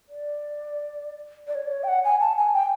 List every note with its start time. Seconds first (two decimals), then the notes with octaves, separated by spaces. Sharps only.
0.09 D5
1.47 D5
1.55 C#5
1.66 D5
1.71 C#5
1.83 G5
1.88 F#5
2.04 G#5
2.20 A5
2.38 G#5
2.54 G5